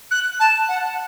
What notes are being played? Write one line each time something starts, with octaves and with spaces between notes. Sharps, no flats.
F#6
A5
F#5